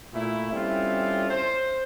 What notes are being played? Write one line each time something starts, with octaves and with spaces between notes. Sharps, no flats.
A#2 A3 E4
G3 C4 C#4 E4 F4 A4
C5